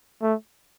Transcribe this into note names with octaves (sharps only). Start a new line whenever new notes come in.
A3